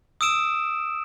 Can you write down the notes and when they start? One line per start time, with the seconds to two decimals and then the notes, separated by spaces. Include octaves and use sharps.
0.21 D#6 E6 D7 E7